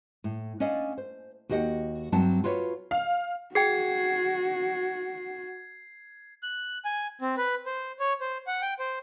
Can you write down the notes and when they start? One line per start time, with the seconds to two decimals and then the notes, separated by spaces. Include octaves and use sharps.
0.24 A2
0.60 C#4 D4 D5 D#5 F5 F#5
0.98 C5
1.49 D#2 F#4 G4 D#5 F#5
2.12 G2 F#3 C4 F#5 A5
2.44 F4 F#4 B4 C#5
2.91 F5
3.55 F#4 G#4 G5 G#6 C7
6.43 F#6
6.85 G#5
7.21 C4
7.37 B4
7.66 C5
8.00 C#5
8.21 C5
8.47 F#5
8.62 G5
8.79 C5